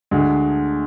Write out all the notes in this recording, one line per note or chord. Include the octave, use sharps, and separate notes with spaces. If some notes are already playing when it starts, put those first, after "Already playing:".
D2 D3 G#3